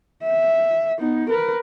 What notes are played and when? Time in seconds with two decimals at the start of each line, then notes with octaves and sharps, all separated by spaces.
0.24 E5
0.99 B3 D#4
1.29 A#4 B4